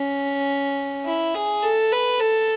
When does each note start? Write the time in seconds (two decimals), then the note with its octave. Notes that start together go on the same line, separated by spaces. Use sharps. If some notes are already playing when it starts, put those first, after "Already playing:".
Already playing: C#4
1.05 E4
1.34 G#4
1.63 A4
1.92 B4
2.20 A4